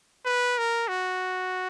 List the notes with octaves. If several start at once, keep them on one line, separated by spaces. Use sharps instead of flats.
B4
A#4
F#4